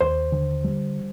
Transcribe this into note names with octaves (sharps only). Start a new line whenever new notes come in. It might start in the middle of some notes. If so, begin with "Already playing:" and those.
D#2 C5
D3
G3